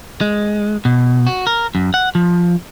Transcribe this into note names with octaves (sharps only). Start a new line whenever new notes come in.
G#3
B2
F#4
A#4
F#2
F#5
F3